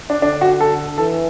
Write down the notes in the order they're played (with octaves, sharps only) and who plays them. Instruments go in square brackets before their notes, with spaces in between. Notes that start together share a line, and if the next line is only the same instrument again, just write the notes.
[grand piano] D4
[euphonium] D3 [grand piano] D4
[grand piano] F#4
A4
[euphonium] E3 [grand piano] A4